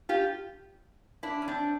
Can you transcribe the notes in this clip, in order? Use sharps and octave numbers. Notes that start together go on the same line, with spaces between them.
F4 G4
D4 E4
C#4
C4 D4